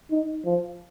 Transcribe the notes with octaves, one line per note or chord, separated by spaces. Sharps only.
D#4
F3